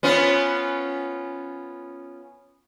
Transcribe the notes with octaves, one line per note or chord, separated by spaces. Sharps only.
B3 C#4 F4